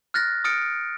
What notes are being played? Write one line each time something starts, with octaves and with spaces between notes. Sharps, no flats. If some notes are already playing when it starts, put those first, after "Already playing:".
F6 F#6 A6 A#6
D#6 F6 A6 C#7 D7